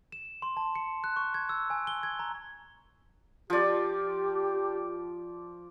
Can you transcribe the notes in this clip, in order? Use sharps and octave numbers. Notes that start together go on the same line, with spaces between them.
E7
C6
A5
C#7
F#6
C#6
G#6
E6
G#5
G7
G#6
A#5
F3 G4 D5